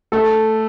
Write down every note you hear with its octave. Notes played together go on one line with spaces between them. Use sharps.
A3 A4